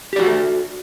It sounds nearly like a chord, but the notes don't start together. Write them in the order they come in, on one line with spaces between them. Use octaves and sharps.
G4 D5 F#4 F#5 A4